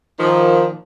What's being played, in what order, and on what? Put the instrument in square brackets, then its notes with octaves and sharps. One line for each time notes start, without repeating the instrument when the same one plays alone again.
[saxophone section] A#2 D#3 F3